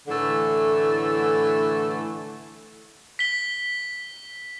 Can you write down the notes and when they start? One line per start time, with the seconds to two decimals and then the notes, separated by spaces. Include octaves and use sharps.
0.07 A2 D3 E3 A3
3.19 B6 G7